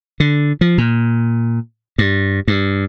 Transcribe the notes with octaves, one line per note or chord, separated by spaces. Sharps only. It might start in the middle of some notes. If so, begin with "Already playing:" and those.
D3
F3
A#2
G2
G2